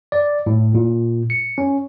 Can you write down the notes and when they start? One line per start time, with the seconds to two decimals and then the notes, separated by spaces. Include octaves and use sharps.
0.12 D5
0.46 A2
0.75 A#2
1.30 C#7
1.58 C#4